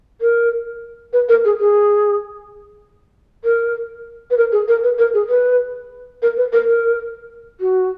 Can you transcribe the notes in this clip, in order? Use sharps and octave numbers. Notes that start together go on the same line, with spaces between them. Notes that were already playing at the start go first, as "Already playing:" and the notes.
A#4
B4
A#4
G#4
G#4
A#4
B4
A#4
G#4
A#4
B4
A#4
G#4
B4
A#4
B4
A#4
A#4
F#4